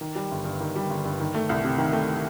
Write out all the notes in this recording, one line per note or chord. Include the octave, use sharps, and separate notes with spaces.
D#3
G3
G1
G2
D#3
G3
G1
G2
D#3
A3
C2
C3
D#3
A3